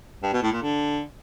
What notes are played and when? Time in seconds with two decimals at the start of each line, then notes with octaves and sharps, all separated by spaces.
0.23 G2
0.33 B2
0.42 A2
0.52 A#2
0.62 D3